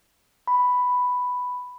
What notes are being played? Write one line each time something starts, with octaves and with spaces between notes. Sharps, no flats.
B5